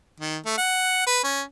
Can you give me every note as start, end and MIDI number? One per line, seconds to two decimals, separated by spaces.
0.20 0.37 51
0.45 0.55 57
0.57 1.02 78
1.06 1.20 71
1.24 1.41 61